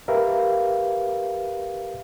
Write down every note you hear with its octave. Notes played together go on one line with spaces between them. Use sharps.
G4 A#4 B4 E5 F5